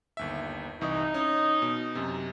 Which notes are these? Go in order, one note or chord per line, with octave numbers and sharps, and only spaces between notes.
G1 D#2 E5
C2 E3 D#4 C#6
C#4
B2
F#2 C3